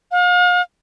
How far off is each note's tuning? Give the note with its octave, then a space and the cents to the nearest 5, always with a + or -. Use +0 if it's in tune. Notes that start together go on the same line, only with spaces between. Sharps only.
F5 +40